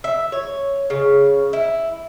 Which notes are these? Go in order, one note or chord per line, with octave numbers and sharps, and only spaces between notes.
E5
C#5
C#3
E4